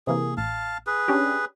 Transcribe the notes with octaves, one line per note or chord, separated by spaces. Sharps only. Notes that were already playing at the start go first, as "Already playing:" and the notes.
C3 E3 A#3 G#4
A1 F5 A5
G#4 B4
C#4 D4 G4